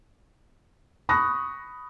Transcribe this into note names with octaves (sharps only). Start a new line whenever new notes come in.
B5 C#6 D#6 F#6 A#6